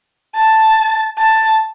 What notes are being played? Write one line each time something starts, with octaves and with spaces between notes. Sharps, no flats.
A5
A5